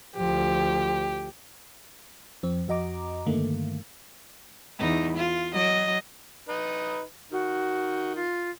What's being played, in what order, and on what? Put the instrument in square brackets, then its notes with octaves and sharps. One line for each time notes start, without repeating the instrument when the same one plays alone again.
[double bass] D2 F3 [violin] G4
[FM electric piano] F2 C4
F2 F#4 D#5 A#5 D6
G2 D3 D#3 A3 A#3
[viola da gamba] E2 D#4
F4
F#3 D#5
[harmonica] D#4 B4
[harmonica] D#3 [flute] F#4
[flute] F4